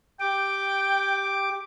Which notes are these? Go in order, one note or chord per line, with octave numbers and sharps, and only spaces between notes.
G4 G5 D6